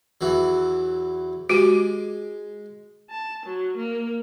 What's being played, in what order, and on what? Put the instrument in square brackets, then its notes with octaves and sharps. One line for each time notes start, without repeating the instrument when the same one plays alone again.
[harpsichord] E2 E3 F#3
[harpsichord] G#3 [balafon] F#4 G4
[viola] A5
F#3
A#3